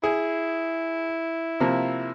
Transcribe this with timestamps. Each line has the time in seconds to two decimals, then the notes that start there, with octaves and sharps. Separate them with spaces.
0.04 E4 G#4
1.60 C3 F3 A#3